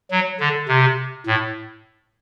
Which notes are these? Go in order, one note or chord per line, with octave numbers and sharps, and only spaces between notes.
F#3
D3
C3
A2